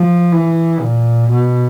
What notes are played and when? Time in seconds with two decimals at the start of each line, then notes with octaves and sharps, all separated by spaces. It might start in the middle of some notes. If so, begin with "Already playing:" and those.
Already playing: F3
0.31 E3
0.80 A#2
1.30 B2